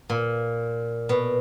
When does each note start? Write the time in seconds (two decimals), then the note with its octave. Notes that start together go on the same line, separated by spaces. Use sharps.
0.09 A#2
1.09 B2